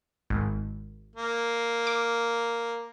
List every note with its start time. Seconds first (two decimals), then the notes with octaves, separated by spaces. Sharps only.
0.30 G#1
1.16 A#3
1.87 D6